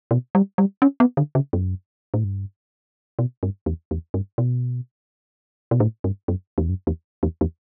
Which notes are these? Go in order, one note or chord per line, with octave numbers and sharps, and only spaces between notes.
B2
G3
G3
C#4
B3
D3
C#3
F#2
A2
G2
B2
G2
E2
E2
G2
B2
B2
A2
G2
F#2
E2
F#2
E2
E2
E2